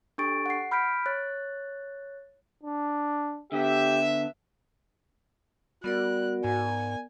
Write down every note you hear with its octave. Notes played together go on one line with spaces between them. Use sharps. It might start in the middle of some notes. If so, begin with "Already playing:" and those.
D4 G4 A4 C#6 A6 D7
F#5 C7
B5 F6 G6 B6 D7
C#5 F#6 A6
D4
D3 B3 G4 E5
G3 B3 F#4 A#4 D5 F#6
G#2 G#5